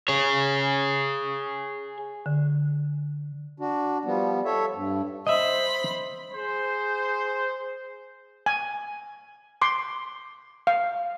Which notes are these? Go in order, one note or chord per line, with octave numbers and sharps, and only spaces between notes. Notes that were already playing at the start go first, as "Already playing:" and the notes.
G#4 C#5
D3
D4 F#4
F3 G3 B3
A4 C#5 E5
G2
C5 D#5 E5 B5
G#4 C5
G#5
C6 D6
F5